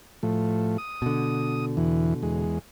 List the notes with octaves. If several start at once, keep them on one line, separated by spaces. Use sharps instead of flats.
A2 F3 A3
D#6
B2 D3
E2 E3
E2 G#3